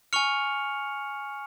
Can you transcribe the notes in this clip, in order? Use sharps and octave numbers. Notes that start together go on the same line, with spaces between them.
G#5 C#6 F6 C#7 F7